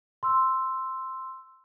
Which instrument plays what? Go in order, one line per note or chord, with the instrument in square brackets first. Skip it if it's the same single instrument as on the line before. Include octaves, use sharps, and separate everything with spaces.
[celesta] C6 E6